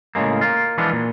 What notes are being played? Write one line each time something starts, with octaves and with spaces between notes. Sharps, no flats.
A2 C#3 G#3 A#3
A#3 F4
E3 F3 G#3 B3 D4 F4
A#2